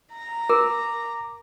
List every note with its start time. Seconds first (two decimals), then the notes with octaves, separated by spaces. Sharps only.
0.13 A#5
0.50 A#4 D6